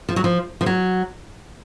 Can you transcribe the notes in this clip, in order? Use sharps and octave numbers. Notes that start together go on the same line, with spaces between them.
F3
F#3
F3
F3
F#3